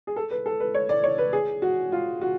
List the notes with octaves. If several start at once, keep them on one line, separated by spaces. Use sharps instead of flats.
G#4
A4
B4
A4
B4
C#5
D5
C#5
B4
G#4
F#4
F4
F#4